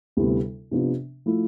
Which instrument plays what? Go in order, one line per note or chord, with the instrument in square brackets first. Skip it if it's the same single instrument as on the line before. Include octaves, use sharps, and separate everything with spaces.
[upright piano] D2 C3 G3 B3 E4
C3 F3 B3 D4
F3 A3 E4